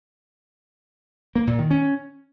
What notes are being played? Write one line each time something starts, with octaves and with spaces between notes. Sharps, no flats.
A#3
A#2
D#3
C#4